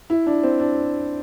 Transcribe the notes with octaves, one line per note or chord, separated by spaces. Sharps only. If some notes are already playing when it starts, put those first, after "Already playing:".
E4
D4
C4
D4